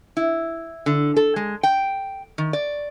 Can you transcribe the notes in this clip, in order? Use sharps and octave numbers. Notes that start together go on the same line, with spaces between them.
E4
D3
A4
G#3
G5
D#3
D5